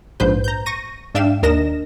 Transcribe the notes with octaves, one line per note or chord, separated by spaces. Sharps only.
A#1 G#2 B4 C5 G6
A#5 G6
C#6 A#6 D#7
G#2 D4 E5 F5 G5 E7
D#2 D4 A#4 D#5 A#6 E7